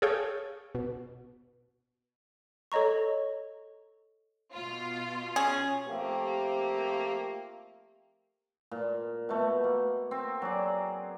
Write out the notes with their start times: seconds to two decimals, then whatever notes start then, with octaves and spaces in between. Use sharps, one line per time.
0.02 G#4 A4 C#5 F5 G5
0.75 B2
2.72 A4 C#5 D#5 A#5 C#6
4.54 B2 F4
5.36 C#4 G#4
5.88 F3 A3 A#3 C4 G4
8.72 A#2
9.29 B2 A3
9.64 A#3
10.11 C4
10.42 F#3 G#4 D5